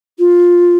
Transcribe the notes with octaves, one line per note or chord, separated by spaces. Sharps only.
F4